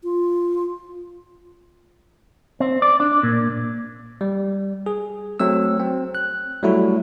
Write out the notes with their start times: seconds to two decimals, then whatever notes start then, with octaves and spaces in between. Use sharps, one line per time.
0.04 F4
2.60 C4
2.82 D5
3.00 D4
3.23 A#2
4.21 G3
4.86 G#4
5.40 F#3 A3 C4 E6
5.80 C4
6.15 F#6
6.62 F#3 G3 A3 E4 F#4